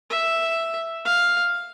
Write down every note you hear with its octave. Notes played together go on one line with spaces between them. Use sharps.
E5
F5